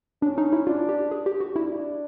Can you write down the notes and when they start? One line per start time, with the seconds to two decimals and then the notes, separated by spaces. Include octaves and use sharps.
0.22 C#4 D4
0.38 D#4
0.53 E4
0.67 D4 F4
0.89 G4
1.11 G#4
1.26 G4
1.41 F#4
1.55 D4 E4